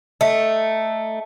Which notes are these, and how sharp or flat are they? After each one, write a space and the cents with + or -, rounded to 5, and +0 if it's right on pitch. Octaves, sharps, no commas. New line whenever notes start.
A3 +0 D#4 +0